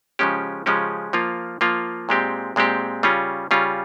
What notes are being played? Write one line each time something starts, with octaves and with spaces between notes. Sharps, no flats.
C#3 F3 G#3 C#4 G4
C#3 F3 G#3 C#4 G4
F3 A#3 F4
F3 A#3 F4
A#2 G#3 C4 G4
A#2 G#3 C4 G4
C#3 G3 C#4 F4
C#3 G3 C#4 F4